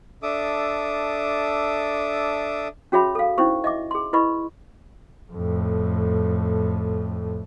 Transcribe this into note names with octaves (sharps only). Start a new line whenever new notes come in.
D4 A4 E5 D6 D#6
C#4 F#4 G#4 C#5 E5 B5
A4 F5
C#4 D#4 E4 C5 C#6
D#5 E5 D6
G#4 C6
E4 B4 D#5 B5 C#6
F2 A2